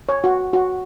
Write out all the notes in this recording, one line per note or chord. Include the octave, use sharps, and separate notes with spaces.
C#5
F#4
F#4